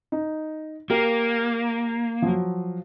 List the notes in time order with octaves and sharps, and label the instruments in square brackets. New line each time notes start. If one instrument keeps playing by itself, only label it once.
[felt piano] D#4
[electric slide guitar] A#3 [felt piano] G4 A#4
[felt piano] F3 F#3